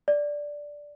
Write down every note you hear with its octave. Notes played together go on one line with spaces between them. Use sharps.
D5